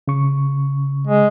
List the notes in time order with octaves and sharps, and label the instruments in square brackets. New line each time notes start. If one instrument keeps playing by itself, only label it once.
[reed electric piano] C#3 C#6
[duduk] G#3